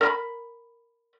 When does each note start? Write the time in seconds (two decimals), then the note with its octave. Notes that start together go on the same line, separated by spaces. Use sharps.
0.01 A#4 B5